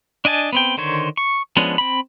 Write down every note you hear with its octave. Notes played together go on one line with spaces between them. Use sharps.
D4 D#5 G#5 A5
B3 C4 G5
D3 D#3 C5 C#5
C#6
F3 G#3 B3 C#4 D4
C4 B5